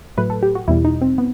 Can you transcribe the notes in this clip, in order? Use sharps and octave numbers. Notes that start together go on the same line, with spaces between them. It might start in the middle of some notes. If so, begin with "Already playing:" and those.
A2 F#3 A3 B4
A4
G4
F#4
E2 B2 G3 E4
D#4
C4
B3